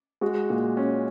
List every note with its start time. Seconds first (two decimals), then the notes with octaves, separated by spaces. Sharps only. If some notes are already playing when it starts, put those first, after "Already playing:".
0.21 G#3 F#4
0.50 A#2
0.77 C#4